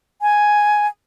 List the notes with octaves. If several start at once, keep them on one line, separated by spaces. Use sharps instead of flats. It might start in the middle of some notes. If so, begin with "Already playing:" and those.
G#5